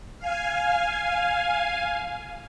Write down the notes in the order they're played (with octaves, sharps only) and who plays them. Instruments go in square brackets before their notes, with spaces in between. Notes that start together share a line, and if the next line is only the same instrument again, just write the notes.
[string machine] F5 G#5